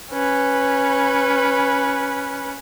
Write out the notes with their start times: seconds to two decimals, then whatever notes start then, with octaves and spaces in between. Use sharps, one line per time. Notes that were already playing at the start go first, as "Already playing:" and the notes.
0.13 C#4 B4